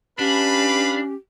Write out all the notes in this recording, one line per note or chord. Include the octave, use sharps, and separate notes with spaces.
C#4 D4 G4 B4 F5 B5